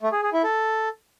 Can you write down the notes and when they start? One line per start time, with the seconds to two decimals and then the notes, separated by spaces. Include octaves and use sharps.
0.01 A3
0.12 G#4
0.22 G#4
0.33 E4
0.43 A4